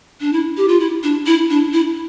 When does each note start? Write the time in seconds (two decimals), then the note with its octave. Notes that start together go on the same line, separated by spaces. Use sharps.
0.21 D4
0.33 E4
0.57 G4
0.68 F4
0.80 E4
1.03 D4
1.26 E4
1.50 D4
1.73 E4